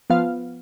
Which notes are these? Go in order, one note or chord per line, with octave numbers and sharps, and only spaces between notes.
F3 B3 F5